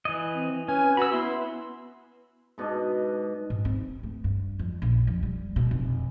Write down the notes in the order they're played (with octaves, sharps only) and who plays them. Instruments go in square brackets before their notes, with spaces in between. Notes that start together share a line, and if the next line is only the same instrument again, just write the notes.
[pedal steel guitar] E3 D#5
[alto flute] C4
[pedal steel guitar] C#4 [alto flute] B4 [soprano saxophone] G#5
[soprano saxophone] F#4 [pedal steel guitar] B5 E6
[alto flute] B3 [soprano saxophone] E4 [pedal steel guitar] C6
[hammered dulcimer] G#2 B2 D4 D#5
[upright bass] G#2
C4
A3
G2
F2
A#1
F2
G3
B2
F1